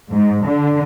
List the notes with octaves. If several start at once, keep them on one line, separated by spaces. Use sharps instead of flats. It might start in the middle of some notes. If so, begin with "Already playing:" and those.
G#2
D3